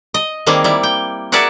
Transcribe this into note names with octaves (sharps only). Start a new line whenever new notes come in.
D#5
D#3 G3 A#3 C4 G#4
G3 E4
G5
F#4 G#4 A#4 D5 E5 F#5